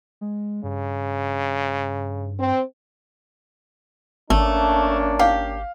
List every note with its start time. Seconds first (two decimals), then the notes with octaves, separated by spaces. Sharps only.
0.21 G#3
0.63 G2 C#3
2.39 C4
4.30 G#1 A3 A#3 C#4 D4
5.19 G4 F5